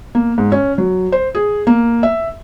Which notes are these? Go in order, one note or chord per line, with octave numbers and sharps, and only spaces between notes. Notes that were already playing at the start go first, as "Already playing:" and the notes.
A#3
G#2
C#4
F#3
C5
G#4
A#3
E5